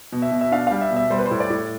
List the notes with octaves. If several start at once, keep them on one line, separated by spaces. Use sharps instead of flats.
B2
E5
B2
E5
D4 F5
G3 F5
E5
B2
E5
G3 C5
B4
C5
A2
D5
A2